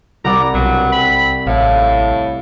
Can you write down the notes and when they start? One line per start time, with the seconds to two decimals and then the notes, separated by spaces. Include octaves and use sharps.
0.24 C2 D5 F#5 A#5
0.54 B1 G2 A#2 F#3
0.92 C4 B5
1.47 A1 A2 F5